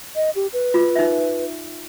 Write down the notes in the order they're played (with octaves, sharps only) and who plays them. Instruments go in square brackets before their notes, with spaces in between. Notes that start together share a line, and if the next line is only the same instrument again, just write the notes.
[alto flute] D#5
G4
B4
[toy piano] F4
D#4 E5